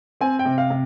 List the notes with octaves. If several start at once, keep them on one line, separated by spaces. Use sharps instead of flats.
C4 G#5
G5
C3
F5
C3